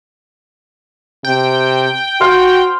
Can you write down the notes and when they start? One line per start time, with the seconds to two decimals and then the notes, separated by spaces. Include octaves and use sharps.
1.25 C3 G5
2.21 F#4 C5 F5